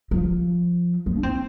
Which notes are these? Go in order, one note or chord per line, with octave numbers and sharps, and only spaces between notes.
F3
G#3
D4
C4